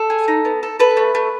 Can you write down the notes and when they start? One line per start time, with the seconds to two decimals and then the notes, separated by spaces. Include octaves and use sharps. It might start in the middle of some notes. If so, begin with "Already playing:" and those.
Already playing: A4
0.10 G#4
0.28 D#4
0.45 B3
0.63 A4
0.79 A4 B4
0.97 A3
1.15 A3